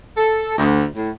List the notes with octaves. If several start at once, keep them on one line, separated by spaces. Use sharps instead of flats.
A4
D2
A2